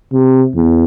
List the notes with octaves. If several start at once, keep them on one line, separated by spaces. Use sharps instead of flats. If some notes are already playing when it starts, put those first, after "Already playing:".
C3
E2